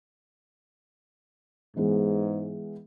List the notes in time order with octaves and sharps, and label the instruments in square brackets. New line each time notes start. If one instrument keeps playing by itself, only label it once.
[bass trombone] G#2 [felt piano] E3 G#3 B3